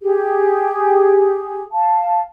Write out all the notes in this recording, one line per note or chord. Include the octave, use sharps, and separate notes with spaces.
G4 G#4
F5 A5